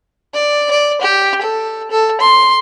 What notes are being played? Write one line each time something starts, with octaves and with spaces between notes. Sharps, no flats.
D5
D5
G4
A4
A4
C6